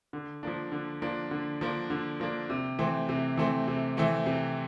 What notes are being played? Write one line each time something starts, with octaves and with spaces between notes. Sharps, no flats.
D3
F3 A#3 D4
D3
F3 A#3 D4
D3
F3 A#3 D4
D3
F3 A#3 D4
C3
E3 A3 C4
C3
E3 A3 C4
C3
E3 A3 C4
C3